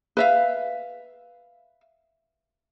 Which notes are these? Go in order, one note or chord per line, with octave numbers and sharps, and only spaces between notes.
B4 E5 F5